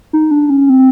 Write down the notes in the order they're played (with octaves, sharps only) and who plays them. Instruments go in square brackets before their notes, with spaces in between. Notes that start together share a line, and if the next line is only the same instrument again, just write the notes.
[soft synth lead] D#4
D4
C#4
C4